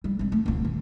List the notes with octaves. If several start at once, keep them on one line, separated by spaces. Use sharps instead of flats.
G3
F2 G#3
A3
D#1 D2
D#3